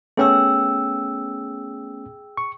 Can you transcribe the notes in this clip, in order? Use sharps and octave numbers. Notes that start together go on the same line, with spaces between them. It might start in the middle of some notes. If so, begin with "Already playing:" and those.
A3 B3 C#4 G#4 G5 E6
C#6